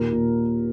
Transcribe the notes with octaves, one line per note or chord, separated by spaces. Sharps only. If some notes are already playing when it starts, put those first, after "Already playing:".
Already playing: D#2 A#2 A#4
A#2